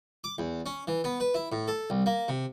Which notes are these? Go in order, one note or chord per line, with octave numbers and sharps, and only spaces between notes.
D6
E2
C#4
E3
B3
B4
E4
A2
A4
C2
A#3
C3